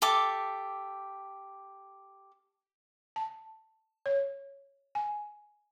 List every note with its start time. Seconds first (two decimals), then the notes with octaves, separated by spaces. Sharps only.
0.02 G4 A4 E5 D6
3.16 A5
4.06 C#5
4.95 G#5